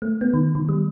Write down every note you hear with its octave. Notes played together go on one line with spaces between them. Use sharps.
A3
B3
D#3
D#3
G3